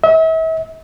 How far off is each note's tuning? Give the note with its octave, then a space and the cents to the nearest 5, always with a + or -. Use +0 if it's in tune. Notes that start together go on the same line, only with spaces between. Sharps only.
E5 -40